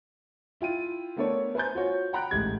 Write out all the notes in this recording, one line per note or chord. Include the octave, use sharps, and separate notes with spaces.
E4 F4 G5 D#7
A3 B3 D4 A4 A#4 C#5
B4 C5 G#5 A#5 G6
F4 F#4 C#5
F#5 G5 A#5 B5 F#6
A1 G#2 A3 G4 G#6